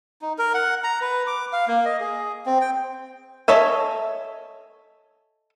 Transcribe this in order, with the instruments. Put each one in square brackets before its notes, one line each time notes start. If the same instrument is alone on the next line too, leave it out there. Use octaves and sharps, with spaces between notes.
[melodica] D#4
A#4
F#5
A#5
B4
D6
F5
A#3
D#5
G#4
C4
G5
[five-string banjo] A4 C#5 D#5 E5 G#5